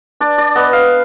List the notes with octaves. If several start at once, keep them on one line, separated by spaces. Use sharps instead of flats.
D4 D5
D5
B3 D#5
F5